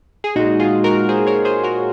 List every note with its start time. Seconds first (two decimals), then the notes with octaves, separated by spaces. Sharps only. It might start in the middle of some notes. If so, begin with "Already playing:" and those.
0.24 G#4
0.36 A#2 G#3 D#4 F#4
0.59 F4 G#4
0.84 F#4 A#4
1.09 G#4 C5
1.27 A#4 C#5
1.45 G#4 C5
1.63 F#4 A#4